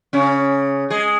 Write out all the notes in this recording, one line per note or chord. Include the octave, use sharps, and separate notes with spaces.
C#3 C#4
G#3 G#4